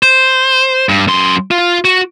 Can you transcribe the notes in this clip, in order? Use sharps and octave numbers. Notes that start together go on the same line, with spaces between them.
C5
G2
F#2 C6
F4
F#4